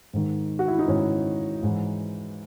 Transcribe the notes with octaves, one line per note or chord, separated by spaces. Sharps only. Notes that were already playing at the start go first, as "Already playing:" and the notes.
G#2 D#3
F#4
E4
D#4
G#2 D#3 C#4
G#2 E3